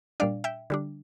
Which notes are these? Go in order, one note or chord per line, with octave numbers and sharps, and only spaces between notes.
A#2 G3 D4 D5 F5
E5 G5
D3 G3 D4